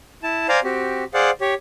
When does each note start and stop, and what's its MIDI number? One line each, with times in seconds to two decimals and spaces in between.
0.23 0.47 64
0.23 0.47 81
0.49 0.60 72
0.49 0.60 74
0.49 0.60 77
0.49 0.60 80
0.49 0.60 82
0.64 1.04 60
0.64 1.04 66
0.64 1.04 67
1.14 1.31 68
1.14 1.31 72
1.14 1.31 74
1.14 1.31 77
1.14 1.31 78
1.41 1.54 67
1.41 1.54 73